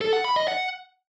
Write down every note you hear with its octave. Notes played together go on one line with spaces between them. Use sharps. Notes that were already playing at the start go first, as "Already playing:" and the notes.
A4
F#5
B5
D#5
F#5